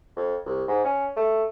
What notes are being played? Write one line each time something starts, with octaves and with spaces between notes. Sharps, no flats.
F2
C2
G#2
C#4
A3